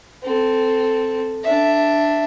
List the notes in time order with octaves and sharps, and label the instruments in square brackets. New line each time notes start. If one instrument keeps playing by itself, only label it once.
[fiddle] C4 A4
D4 E5